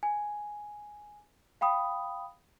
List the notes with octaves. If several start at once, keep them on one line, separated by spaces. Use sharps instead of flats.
G#5
F5 G5 B5 D#6